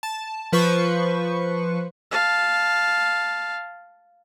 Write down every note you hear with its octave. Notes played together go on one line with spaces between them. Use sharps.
A5
F3 B4 C5 C#6
F5 A5